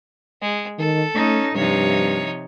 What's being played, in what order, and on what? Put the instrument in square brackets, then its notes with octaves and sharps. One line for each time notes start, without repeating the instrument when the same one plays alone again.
[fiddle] G#3
[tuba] D#3 [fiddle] A4
[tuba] A3 [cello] C#4 D#4
[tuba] G2 [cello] C3 F3 [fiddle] D#4 C#5